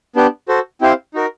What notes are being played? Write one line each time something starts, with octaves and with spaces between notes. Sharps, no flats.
B3 D4 G4
F#4 A4 C5
C4 E4 G4 C5 F5
D#4 F#4 A#4